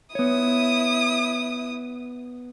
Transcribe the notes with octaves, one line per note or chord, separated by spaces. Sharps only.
B3 E4 C#5 D#6